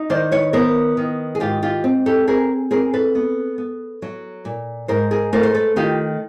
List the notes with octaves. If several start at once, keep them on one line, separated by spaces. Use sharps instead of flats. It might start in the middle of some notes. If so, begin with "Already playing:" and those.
Already playing: D#4
D#3 C5 D5
B4 C#5
B3 A#4 C5
D#3
G#4
G#2 F4 G4
F4 G4
C4
G4 A4
C4 G#4 A#4
C4 G#4 A#4
A4 B4
B3
B3
F#3
A#2
G#2 A#4 C5
G#4 A#4
A3 A#4 C5
C5
A4 B4
D#3 F4 G4